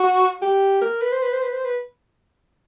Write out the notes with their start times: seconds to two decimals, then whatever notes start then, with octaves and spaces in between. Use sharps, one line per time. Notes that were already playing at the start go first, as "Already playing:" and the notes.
Already playing: F#4
0.42 G4
0.81 A#4
1.01 B4
1.12 C5
1.22 B4
1.33 C5
1.42 B4
1.53 C5
1.64 B4